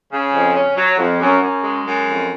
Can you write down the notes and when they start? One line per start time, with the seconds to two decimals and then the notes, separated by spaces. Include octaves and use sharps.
0.10 C#3
0.32 F2
0.54 C#4
0.76 F#3
0.97 F2
1.19 F#2
1.41 F#2
1.63 G#3
1.84 F#2
2.06 F2